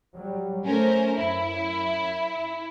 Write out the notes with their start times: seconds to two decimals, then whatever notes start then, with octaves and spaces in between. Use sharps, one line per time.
0.15 F#3 G3
0.66 A3 C#4 A#4 C5
1.16 F#2 E4